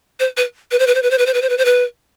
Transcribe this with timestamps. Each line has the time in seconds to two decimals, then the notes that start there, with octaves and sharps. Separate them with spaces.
0.20 C5
0.37 B4
0.71 B4
0.79 C5
0.87 B4
0.95 C5
1.02 B4
1.11 C5
1.18 B4
1.26 C5
1.34 B4
1.42 C5
1.49 B4
1.58 C5
1.65 B4